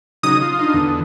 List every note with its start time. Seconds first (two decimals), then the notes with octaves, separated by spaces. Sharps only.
0.23 C#3 F#3 D#4 D#6
0.42 F4
0.59 D4 D#4 F4
0.74 E2 D3